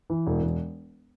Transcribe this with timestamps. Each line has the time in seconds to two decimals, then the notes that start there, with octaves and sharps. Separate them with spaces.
0.10 E3
0.26 E1
0.42 E1